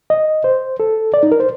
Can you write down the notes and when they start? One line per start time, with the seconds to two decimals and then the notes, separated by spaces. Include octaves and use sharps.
0.10 D#5
0.44 C5
0.80 A4
1.14 D5
1.23 D#4
1.32 A#4
1.40 C5